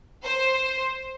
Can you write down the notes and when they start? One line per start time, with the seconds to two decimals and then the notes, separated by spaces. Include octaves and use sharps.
0.24 C5